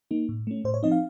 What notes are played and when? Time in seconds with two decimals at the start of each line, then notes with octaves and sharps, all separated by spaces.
0.11 A#3 D#4
0.29 A2
0.47 A3 C#4
0.64 A2 C5
0.74 C#5
0.83 F3 C4 D#4 D#5
0.92 F5